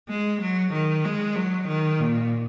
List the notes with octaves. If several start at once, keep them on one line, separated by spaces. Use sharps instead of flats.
G#3
F#3
D#3
G#3
F#3
D#3
A#2